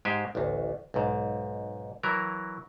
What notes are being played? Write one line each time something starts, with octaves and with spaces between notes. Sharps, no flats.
G#2 G#3 G4 C5 G#5
A1 D2
B1 G#2
E3 F#3 E4 A#4